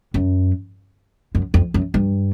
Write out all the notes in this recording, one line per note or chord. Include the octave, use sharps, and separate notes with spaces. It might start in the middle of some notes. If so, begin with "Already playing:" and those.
F#2
F#2
F2
F#2
G2